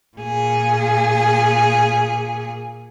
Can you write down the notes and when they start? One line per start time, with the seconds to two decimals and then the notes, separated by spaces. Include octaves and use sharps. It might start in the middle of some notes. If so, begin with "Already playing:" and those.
0.18 A#2 G#4